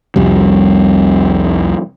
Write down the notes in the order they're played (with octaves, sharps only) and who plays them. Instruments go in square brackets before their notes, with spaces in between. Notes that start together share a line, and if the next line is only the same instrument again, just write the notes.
[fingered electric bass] C2 F2 G3